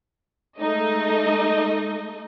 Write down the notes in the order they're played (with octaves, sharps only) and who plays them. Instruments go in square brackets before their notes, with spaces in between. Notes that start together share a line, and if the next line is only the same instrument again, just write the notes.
[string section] G#3 A3 D#4 D#5